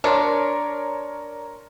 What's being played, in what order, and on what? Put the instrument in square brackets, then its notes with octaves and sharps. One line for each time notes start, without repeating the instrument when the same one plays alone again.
[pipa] D4 [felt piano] A#4 C#5 C6